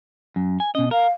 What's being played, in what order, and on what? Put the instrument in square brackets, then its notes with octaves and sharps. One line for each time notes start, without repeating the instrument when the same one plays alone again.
[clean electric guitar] F#2
G#5
[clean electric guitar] B2 D#5 [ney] C#4
[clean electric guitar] A#4 [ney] F5